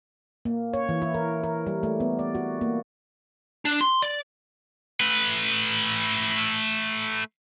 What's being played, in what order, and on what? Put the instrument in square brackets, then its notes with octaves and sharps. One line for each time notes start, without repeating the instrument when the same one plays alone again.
[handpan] A#3
C#5
E3
E4
A#4
A#4
G3
A3
B3
D5
F#4
A#3
[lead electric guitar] D4
C6
D5
[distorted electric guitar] A3 B4